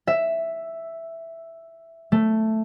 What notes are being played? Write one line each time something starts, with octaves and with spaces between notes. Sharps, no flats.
E5
A3